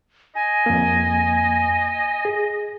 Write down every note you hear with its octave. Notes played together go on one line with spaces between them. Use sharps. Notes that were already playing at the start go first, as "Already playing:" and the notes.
D#5 G#5
F2 A#3
G#4